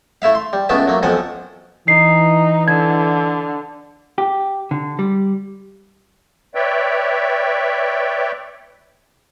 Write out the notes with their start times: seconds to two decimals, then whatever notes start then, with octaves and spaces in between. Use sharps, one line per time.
0.22 A3 E4 E5 F5
0.35 C6
0.53 G3
0.69 C#2 C#3 A3 B3 E5 A5
0.87 F#3 A3 A#3
1.03 B1 F2 F3 A4 F#5 G#5
1.88 E3 D#4 C7
2.68 D3 G#6
4.18 G4
4.71 D3
4.99 G3
6.55 B4 C#5 D5 E5 G5